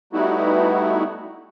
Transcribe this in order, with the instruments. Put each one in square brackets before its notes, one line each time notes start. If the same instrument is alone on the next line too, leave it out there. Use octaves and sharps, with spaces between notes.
[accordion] G3 A3 B3 D#4 E4 F#4